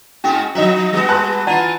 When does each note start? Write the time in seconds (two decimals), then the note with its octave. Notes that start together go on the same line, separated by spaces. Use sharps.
0.24 G#2 G#3 C#4 F#4
0.55 F3 F#3 D#4 E5
0.93 G3 B3 F#4
1.09 B4 G#5 A5 C6 F#6
1.47 E3 F4 D5 F#5 A#5